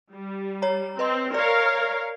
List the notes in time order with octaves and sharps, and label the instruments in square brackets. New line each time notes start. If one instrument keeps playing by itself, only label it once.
[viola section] G3
[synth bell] C#5 A#5
[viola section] C4 [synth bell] B4 D#5 C6
[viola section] A#4 C#5 F5 [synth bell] D5